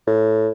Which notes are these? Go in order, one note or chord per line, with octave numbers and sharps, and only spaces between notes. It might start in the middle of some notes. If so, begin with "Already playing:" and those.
A2